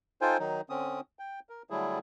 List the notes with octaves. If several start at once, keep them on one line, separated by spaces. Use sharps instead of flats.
D#4 F4 A4 C5 G5 G#5
D#3 F#3 D#4
D3 C4 C#4 D#6
G5
A#4
D3 F#3 G3 A3 E4 G#4